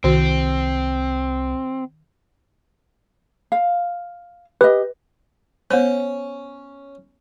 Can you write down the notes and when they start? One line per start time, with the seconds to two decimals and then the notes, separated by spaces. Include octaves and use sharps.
0.04 C2 D#3 C4 F#4
3.52 F5
4.61 G4 B4 D#5
5.71 B3 C#4 C5